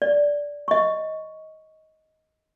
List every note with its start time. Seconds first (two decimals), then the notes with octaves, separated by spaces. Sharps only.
0.02 D5
0.68 D#5 C#6